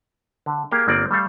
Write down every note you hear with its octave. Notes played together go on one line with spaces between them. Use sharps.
D3
A#3 G4 G#4 A#4 F5 G5
G1 A#3 C4 D5
G3 A3 A4 F5